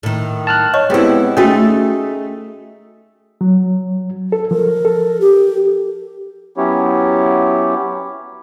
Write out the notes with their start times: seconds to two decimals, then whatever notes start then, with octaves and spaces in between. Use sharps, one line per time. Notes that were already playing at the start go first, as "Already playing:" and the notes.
0.03 A2 D#3
0.47 A5 F6 F#6
0.74 C#5 D#5 C#6
0.90 G#3 B3 C4 E4 G4
1.37 A3 C#4 D#4 F#4 G#4 E5
3.41 F#3
4.32 A4
4.51 F3 A#4
4.85 A4
5.21 G4
6.57 F#3 B3 C#4 E4 G4 C#5